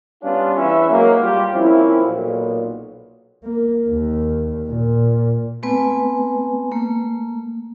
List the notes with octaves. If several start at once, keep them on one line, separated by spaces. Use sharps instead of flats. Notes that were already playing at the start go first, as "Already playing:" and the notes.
G3 B3 C#4 D4 F4
E2 C#4 B4 E5
G#2 F#3 A#3 D#4
G3 F4 G4
F3 A#3 C4 C#4 E4
B1 A#2
A#3
D#2
A#2
A3 B3 C4 B4 G#5
A3 A#3